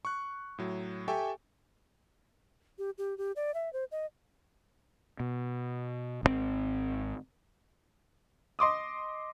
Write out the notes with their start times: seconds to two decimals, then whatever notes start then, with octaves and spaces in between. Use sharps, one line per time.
0.05 C#6 F#6
0.58 A2 F#3
1.08 G4 A4 E5 G5 G#5 C#6
2.78 G4
2.98 G4
3.18 G4
3.36 D5
3.54 E5
3.73 C5
3.92 D#5
5.20 B2
6.23 G#1 D3 C4
8.59 D#5 C6 D6 D#6